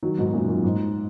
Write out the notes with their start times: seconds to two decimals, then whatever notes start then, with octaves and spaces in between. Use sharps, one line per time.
0.03 D#3 F#3
0.18 G#2 B2
0.33 F#2 A#2
0.49 F#2
0.64 G#2